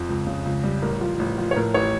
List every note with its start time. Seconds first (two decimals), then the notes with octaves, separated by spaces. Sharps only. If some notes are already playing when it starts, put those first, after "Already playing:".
Already playing: F2
0.09 C#2
0.27 C#3
0.45 C#2
0.63 G3
0.82 A1 A#4
1.01 F3
1.19 A1
1.38 F3
1.51 C#5
1.56 A2 A#4
1.74 A1 C#5